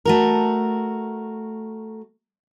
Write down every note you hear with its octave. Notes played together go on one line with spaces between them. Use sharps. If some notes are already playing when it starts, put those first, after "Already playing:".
A3 F#4 A#4